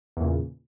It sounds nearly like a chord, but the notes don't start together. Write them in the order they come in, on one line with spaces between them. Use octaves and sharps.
E2 A#2 C#3